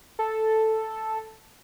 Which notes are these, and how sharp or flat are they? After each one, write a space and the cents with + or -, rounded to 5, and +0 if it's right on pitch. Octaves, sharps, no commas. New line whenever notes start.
A4 +0